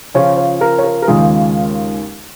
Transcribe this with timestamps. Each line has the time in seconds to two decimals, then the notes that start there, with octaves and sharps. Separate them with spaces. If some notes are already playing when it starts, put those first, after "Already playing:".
0.14 C#3 F3 C#4 F4 C#5
0.38 C#5
0.61 A#4
0.79 C#5
0.84 A#4
1.02 A#4
1.08 D#2 C#3 G#3 F4 G#4